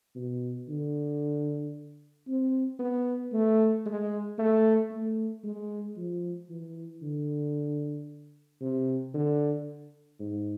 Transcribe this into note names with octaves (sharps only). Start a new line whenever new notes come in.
B2
D3
C4
B3
A3
G#3
A3
A3
G#3
F3
E3
D3
C3
D3
G#2